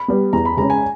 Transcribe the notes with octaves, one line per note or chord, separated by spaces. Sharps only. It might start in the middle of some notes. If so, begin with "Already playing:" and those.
Already playing: B5
G3 B3
E2 A#5
B5
C#3 G#3 C#4 A#5
G#5